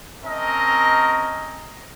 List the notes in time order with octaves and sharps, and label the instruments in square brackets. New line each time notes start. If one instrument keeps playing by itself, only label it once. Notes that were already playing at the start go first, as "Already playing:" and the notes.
[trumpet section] C4 C#4 A#4 D#5 A5 A#5